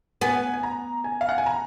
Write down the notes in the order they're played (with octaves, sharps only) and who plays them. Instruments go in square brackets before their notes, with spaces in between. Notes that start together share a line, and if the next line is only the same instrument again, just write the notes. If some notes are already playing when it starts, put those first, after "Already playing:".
[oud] B3 [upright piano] G#5
[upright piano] G#5
A#5
G#5
F5
F#5
G#5
A#5